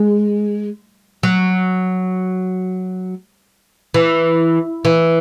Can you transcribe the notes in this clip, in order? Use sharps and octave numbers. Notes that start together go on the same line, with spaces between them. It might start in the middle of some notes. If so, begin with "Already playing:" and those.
Already playing: G#3
F#3
E3
E3